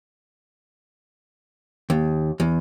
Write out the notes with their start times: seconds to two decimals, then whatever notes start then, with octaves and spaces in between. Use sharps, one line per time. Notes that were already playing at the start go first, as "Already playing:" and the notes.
1.90 D#2
2.40 E2